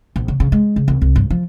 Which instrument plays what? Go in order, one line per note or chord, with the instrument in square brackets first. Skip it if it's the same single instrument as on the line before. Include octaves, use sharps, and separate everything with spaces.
[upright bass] A#1
C#3
C#3
G#3
C#3
C2
C2
G2
F3